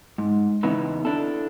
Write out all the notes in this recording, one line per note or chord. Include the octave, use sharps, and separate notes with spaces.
G#2
E2 C#3 B3 D#4 E4
D4 E4 A4